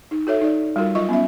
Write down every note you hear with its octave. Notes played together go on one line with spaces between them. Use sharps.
D#4
F#4 A4 C#5 E5
D#4 D5
G3 F4 F#4 A#4
F#3 F4 D#5 C#6
B3 C#4 E5